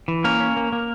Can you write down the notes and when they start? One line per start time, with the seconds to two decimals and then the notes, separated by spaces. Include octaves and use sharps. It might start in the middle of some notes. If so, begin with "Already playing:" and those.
0.08 E3
0.24 A#3 C#4 A#4
0.40 C#4
0.56 A#3
0.72 A#3